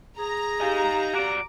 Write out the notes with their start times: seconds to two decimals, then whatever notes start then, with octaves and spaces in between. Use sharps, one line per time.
0.18 G#4 A#5
0.61 D#4 G4 F5 G#5
1.15 F#4 D5 D6